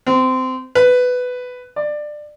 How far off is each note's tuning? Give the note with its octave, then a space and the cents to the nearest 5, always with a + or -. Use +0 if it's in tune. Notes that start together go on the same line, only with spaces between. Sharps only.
C4 -20
B4 +10
D5 +20